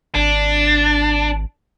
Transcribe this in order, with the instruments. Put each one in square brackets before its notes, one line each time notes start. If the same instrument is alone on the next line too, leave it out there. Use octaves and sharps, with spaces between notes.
[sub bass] G#1 [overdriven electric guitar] D4